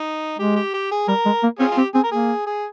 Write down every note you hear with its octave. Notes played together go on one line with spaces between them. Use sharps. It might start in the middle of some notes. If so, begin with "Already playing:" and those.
Already playing: D#4
G#3 G4
G4
G4
G#4
G3 A#4
G#3
A#3
C4 C#4 F4 G#4
F4
C4 G4
C4 G#4
A#4
A#3 G#4
G#4